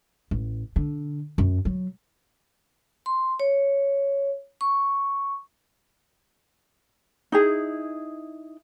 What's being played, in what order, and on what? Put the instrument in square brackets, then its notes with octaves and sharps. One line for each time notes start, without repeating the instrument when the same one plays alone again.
[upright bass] A1
D3
F#2
F#3
[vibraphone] C6
C#5
C#6
[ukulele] D#4 E4 G#4